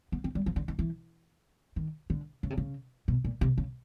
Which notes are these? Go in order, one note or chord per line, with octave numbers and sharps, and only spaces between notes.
B3
C4
G3
F3
D3
D#3
E3
D#3
D3
C#3
C3
C#3
B2
A#2
C3
C#3